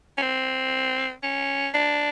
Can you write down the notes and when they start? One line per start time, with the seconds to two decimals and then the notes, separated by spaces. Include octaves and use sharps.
0.18 C#4
0.22 C4
1.23 C#4
1.74 D4